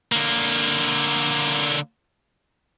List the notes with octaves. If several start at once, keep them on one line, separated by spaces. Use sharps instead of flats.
D3 A#3